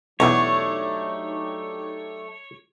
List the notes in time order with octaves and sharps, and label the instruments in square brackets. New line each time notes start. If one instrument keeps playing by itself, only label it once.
[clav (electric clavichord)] B1 E2 [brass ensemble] F#3 D#4 G4 [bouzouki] A3 D4 [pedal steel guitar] C#5